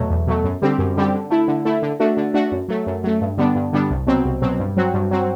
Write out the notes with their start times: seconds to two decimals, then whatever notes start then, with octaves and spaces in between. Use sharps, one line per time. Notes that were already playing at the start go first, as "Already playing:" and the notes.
Already playing: E2 B2 F#3 A3
0.11 E2
0.27 B2 F#3 A3
0.44 F#2
0.62 D3 G3 C4 G4
0.79 F#2
0.97 D3 G3 C4 G4
1.14 D3
1.30 A3 E4
1.48 D3
1.65 A3 E4
1.82 D3
2.00 A3 D4 F#4
2.17 D3
2.34 A3 D4 F#4
2.52 F#2
2.69 F#3 A3
2.86 F#2
3.04 F#3 A3
3.21 G2
3.38 D3 G3 B3 D4
3.55 G2
3.73 D3 G3 B3 D4
3.91 C2
4.07 B2 F#3 C4
4.25 C2
4.42 B2 F#3 C4
4.59 G2
4.77 F#3 C4 F#4
4.94 G2
5.11 F#3 C4 F#4